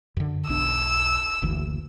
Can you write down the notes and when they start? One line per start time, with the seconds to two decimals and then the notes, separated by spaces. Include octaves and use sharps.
0.17 F#2 D3
0.48 E1 B1 D4 E6
1.42 F#1 D2 E3